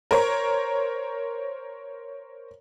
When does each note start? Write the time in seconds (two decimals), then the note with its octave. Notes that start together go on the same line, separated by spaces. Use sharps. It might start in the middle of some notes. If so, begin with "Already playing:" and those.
0.11 A#4 C5 C#5